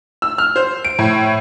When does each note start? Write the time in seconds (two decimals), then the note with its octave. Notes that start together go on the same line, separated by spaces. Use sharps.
0.22 E6
0.38 F6
0.56 C5
0.85 D7
0.99 A2